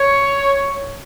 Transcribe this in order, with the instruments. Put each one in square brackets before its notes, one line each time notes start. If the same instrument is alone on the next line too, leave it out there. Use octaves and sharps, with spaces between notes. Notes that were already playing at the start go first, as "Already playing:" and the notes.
Already playing: [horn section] C#5